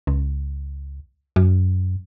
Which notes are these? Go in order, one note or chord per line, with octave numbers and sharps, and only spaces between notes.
C#2
F#2